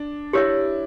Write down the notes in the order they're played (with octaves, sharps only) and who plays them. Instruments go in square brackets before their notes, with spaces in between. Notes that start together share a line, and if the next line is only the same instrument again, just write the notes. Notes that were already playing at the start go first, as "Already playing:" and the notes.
Already playing: [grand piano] D4
[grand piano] E4 [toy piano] G4 C#5 E5